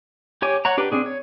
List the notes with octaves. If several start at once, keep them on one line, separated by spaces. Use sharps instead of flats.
G4 C#5 G#5 D6
C#5 F#5 A#5
D4 G4 B4
C4 D4 G#4
C#5